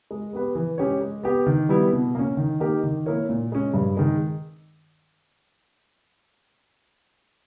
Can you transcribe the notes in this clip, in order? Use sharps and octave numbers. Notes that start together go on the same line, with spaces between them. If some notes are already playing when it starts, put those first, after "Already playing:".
G#3
B3 G4 B4
E3
G#3 C#4 G4 C#5
G#3
B3 G4
D#3
G3 B3 E4
B2
A#3 C#4
D#3
A#3 D#4 G4 A#4
D#3
A#3 E4 A#4 C#5
A#2
G#3 C#4
G2
D#3 G#3